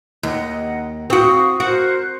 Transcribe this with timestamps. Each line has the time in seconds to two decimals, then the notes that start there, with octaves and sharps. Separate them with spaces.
0.23 D#2 D#5 F#5
1.10 C4 F#4 F5 C#6 D#6
1.60 F#4 A#4 C5 F#6